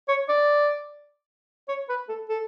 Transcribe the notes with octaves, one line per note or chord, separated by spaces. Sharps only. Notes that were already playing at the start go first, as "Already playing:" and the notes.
C#5
D5
C#5
B4
A4
A4